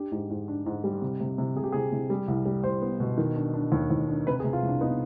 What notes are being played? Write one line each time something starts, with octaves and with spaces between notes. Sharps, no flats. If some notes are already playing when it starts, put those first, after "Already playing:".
Already playing: D4 G4
G#2
G#2
D4
G#2
G3
C3
C3
C3
C3 G#4
G4
C3 G#4
C3
G3
C2
G3
C2 C5
B3
B2
D#3
D4
D4
D#2
D#2
D4
C3 B4
G#4
C3
F4
C2 D4
B3 D#4